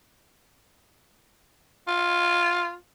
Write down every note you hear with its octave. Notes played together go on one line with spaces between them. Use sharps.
F4